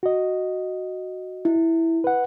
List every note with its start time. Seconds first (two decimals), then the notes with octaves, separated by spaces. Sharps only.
0.03 F#4 D#5
1.45 E4
2.04 B4 F#5